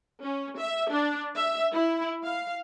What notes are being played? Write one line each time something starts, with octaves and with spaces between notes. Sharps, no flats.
C#4
E5
D4
E5
E4
F5